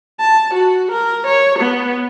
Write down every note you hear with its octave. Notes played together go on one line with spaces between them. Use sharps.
A5
F#4
A#4
C#5
B3